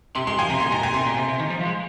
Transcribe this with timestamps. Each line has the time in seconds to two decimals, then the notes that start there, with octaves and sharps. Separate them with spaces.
0.15 C3 C6
0.27 G#3 C6
0.38 F3 G#5
0.49 C3 A#5
0.60 A#2 C6
0.72 G#2 A#5
0.83 A#2 G#5
0.94 C3 C6
1.06 A#2
1.17 C3
1.28 C3
1.39 D#3
1.50 F3
1.61 F3
1.65 G#3